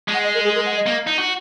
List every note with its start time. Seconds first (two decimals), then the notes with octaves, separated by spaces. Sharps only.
0.08 G#3
0.14 F#5
0.24 D#5
0.34 A#4
0.44 G#4
0.55 A#4
0.66 F#5
0.76 D#5
0.86 A#3
1.07 D#4
1.18 F#4